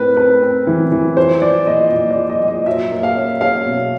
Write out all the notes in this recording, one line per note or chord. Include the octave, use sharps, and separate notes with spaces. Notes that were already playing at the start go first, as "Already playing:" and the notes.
Already playing: A2 C4 A#4 B4
C4 B4
C4
E3
E3
F3 C5
F3 D5
A#2 D#5
A#2
D5
F3
D#5
A#2
D#5
F#3 E5
A#3
F5
C#4
C#4 F5
B2